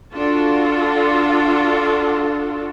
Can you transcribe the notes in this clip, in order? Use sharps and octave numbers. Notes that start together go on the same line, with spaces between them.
D4 F4 F#4 A4